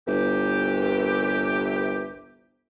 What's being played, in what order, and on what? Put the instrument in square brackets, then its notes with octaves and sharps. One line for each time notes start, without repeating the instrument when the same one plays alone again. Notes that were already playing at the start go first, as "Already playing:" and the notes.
[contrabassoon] G1 [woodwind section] C2 E3 G4